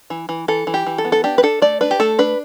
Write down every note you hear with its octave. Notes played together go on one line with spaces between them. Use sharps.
E3
E3
E3 A4
E3
G4
E3
A4
B3
A4
D4 G4
B4
D4 A4
A3 D5
D4 B4
G4
A3 A4
D4 B4